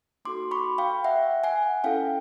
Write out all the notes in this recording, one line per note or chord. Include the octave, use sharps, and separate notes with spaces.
A#3 D#4 F#4 A4 C6 D6
B5 C#6
F5 G5
E5 F#5
F#5 G#5
C#4 E4 A4 F5 G5